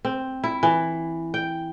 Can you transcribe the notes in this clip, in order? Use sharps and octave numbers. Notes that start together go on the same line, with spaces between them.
C4
E4
E3
G5